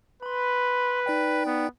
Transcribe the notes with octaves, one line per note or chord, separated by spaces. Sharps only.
B4 B5 C6
D#4 D5 G5
B3